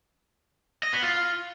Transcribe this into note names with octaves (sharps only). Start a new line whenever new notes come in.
D#5
B3
F4